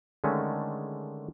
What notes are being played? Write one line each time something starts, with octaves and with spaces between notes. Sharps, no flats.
D3 D#3 G#3 A3 C#4